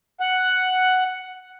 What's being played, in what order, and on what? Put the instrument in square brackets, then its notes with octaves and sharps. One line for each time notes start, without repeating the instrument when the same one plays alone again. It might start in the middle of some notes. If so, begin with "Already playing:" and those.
[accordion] F#5